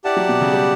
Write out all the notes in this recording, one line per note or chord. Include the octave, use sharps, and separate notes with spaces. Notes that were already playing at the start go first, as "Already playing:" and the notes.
E4 G4 D5 F#5 A5
F#3
B2
C#3
G3